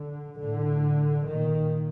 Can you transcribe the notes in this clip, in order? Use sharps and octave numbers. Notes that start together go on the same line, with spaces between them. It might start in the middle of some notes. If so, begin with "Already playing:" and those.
Already playing: D3
A2 D3
A#2 D#3